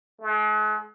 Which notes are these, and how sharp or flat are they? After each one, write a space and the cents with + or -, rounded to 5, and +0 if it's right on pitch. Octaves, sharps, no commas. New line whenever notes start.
G#3 +45